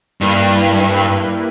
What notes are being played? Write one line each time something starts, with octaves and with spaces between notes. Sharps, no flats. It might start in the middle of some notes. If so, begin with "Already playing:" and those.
G2 G3 A#3 E4 B4